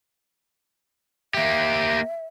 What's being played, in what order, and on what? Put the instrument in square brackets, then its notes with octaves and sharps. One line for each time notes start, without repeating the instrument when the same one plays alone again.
[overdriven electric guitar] A#3 G4 [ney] E5